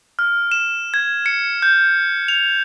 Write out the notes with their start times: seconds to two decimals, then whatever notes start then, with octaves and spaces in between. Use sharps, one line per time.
0.19 F6
0.52 E7
0.94 G#6
1.26 C#7
1.62 G6
2.28 F7